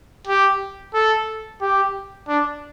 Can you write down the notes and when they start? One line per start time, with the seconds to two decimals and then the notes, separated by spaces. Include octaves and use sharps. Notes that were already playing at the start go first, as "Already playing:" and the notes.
0.27 G4
0.94 A4
1.61 G4
2.28 D4